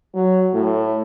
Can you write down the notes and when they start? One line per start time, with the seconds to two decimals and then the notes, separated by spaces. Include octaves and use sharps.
0.15 F#3
0.54 A2